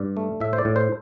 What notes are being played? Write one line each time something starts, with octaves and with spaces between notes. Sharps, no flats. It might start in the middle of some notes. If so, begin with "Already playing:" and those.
Already playing: G2 D5
A3
A2 E5
C5
D5
A2
C5